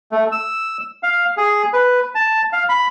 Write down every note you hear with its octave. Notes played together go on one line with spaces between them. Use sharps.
A3
E6
F5
G#4
B4
A5
F5
B5